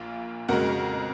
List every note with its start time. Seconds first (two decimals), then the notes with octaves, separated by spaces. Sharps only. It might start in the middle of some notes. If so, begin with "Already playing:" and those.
Already playing: A#1 A#2 F4
0.48 F2 C#3 G#3 F#4 A#4